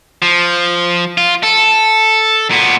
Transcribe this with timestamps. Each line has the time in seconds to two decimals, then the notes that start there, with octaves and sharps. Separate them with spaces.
0.22 F3
1.18 F4
1.43 A4
2.50 A#2 B3